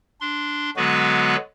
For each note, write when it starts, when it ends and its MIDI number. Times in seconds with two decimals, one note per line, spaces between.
0.21 0.70 62
0.21 0.70 84
0.77 1.36 50
0.77 1.36 54
0.77 1.36 56
0.77 1.36 59
0.77 1.36 66
0.77 1.36 71